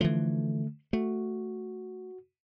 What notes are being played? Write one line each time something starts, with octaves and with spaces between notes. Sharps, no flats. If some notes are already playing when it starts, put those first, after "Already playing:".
D3 E3 F3 A3
A3 F#4